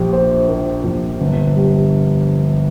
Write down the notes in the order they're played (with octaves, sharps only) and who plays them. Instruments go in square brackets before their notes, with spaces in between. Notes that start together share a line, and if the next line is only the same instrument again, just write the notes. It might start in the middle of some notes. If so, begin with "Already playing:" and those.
Already playing: [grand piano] A#1 G4
A#3 C5
A#2 A#4
A#1
G1
G3